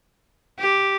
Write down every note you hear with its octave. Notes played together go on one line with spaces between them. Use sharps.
G4